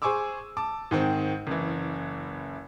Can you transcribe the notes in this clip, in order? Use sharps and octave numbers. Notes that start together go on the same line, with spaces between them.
G#4 C5 G#5 C#6 D6 E6
A5 D6
G#2 D#3 C4
F#1 E3